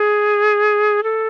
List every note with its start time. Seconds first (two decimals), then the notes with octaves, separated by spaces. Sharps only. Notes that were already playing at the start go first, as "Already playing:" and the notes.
Already playing: G#4
1.03 A4